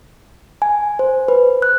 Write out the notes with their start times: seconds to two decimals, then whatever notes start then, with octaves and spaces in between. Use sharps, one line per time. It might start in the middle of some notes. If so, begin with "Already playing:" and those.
0.62 G#5
0.99 C5
1.28 B4
1.62 F#6